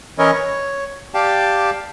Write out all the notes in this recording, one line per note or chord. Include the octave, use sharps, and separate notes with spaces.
E3 C#4 E4 A#4 C#5 D#5
C#5
G4 D5 F5 G5 A5